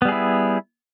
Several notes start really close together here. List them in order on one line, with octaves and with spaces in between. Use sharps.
B3 G3 G#4 E4